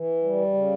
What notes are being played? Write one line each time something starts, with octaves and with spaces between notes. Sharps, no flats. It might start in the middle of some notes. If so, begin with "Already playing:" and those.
Already playing: E3
G3
C#3